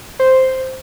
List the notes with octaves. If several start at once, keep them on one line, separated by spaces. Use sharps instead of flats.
C5